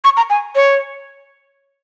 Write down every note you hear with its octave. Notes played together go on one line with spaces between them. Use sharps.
C#6
A#5
G#5
C#5